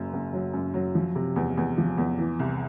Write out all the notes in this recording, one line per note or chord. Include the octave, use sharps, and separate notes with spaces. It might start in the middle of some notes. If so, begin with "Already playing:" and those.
Already playing: F#1 F#2
F#1
F#3
F#2
F#3
F3
C3
E2
E2
F3
E2
E3
C2